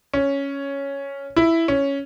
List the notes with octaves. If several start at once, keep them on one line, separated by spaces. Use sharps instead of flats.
C#4
E4
C#4